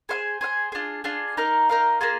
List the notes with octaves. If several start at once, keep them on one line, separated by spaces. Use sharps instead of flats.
G#4 C5 F5 G#5
G#4 C5 F5 G#5
D4 F4 G#4
D4 F4 G#4
D#4 A#4 F5
D#4 A#4 F5
A#3 F4 G#4